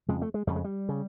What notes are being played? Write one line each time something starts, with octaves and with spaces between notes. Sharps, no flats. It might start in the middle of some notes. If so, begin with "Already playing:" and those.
F2 C#3 G#3
A3
G#3
F2 C#3 G3
G#3
G3
C#3